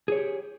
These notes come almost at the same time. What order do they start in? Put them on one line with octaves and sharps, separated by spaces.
G#4 C#5 G4